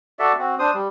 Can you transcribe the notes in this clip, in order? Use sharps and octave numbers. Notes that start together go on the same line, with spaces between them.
F#4 A4 D5 E5
C4 F#4
D4 C5 D#6
G3